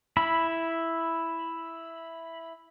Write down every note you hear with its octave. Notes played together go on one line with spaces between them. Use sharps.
E4 B5